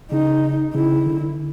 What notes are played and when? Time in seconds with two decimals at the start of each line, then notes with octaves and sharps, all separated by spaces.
0.12 C#3 D#4
0.74 C#3 E4
1.06 D3